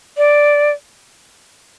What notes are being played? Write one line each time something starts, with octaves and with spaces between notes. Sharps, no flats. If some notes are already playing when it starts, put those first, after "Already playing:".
D5